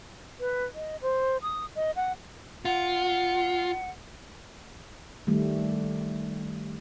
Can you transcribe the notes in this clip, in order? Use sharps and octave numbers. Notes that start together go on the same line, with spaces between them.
B4
D#5
C5
D#6
D#5
F#5
F4 F#5
D#3 G3 A3